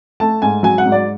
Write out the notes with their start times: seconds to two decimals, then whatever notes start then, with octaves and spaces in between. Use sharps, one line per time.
0.20 A3 A5
0.42 G#2 G#5
0.63 F#3 G#5
0.78 F#5
0.85 G#2
0.92 D5